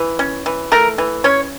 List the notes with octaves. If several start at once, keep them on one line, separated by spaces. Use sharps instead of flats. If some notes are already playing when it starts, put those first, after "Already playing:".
Already playing: E3
C#4
E3
A3 A#4
E3
C#4 C#5